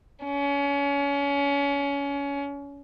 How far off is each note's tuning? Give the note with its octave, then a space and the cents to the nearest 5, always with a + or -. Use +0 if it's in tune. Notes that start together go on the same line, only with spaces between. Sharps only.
C#4 +30